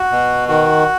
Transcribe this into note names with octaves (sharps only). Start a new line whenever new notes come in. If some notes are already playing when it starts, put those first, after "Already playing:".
Already playing: F#4
B2
D#3 F#4